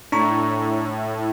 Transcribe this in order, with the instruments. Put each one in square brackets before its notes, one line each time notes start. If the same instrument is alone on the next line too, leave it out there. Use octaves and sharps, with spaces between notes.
[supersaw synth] A2 [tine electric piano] D4 A#5 C#6